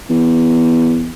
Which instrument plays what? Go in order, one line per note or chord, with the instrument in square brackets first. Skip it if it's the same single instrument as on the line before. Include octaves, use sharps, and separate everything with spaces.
[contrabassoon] E2